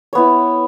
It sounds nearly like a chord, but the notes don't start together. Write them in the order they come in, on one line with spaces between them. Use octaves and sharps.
C#5 B3 E4